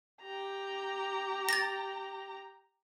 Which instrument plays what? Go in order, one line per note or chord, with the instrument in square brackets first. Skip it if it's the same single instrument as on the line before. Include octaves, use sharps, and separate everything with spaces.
[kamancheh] G4 A#5
[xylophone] A6 A#6